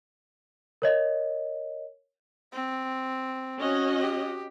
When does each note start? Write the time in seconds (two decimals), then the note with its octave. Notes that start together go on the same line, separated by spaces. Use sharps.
0.82 A#4 C#5 D#5
2.53 C4
3.58 C#4 F#4 D#5
4.01 G4